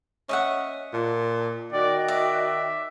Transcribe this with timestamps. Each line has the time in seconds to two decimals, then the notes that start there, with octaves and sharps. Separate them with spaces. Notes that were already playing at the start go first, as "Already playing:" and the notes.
0.29 C#4 D#5 E5 F#5
0.93 A#2 A5
1.72 D#3 F#4 D5 D#5 G5
2.08 D5 E5